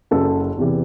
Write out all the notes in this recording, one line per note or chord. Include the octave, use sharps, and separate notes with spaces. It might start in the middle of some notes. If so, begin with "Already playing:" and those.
F#1 F#2 F#3 A4
E2 C3 E3